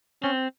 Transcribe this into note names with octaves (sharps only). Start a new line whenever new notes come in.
C4 C#4